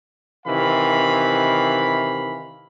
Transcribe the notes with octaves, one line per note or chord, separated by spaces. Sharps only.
C3 D#3 E3 F5 B5